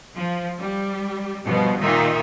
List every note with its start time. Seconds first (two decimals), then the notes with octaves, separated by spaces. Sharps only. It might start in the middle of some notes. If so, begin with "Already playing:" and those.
0.16 F3
0.57 G3
1.43 G2 B2 F3
1.80 A#2 D#3 D#4 F4 E5